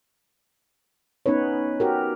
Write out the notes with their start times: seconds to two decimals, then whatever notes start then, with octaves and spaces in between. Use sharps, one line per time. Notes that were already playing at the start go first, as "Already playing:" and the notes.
1.26 B3 C#4 D#4 B4 C#5
1.80 F#4 G4 A#4